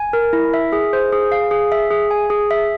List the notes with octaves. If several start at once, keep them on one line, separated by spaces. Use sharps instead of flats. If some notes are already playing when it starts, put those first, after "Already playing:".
Already playing: G#5
A#4
E4
E5
G#4
C5
G#4
F5
G#4
E5
G#4
G#5
G#4
E5